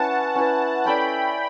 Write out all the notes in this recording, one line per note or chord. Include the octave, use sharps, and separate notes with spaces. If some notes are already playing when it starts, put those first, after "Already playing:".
Already playing: C#4 E4 B4 F#5 A5
C#4 E4 B4
C#4 E4 A4 D5 G5 B5